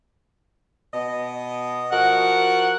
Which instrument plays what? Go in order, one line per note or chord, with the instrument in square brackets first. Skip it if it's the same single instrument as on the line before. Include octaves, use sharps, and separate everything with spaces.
[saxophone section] B2 D#5
[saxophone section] F3 F#4 A#4 [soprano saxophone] F#5